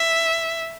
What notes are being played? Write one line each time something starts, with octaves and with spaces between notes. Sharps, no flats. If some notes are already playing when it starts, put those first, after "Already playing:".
Already playing: E5